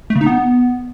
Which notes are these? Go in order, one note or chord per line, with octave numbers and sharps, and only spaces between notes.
A3
C#3
D#4
B3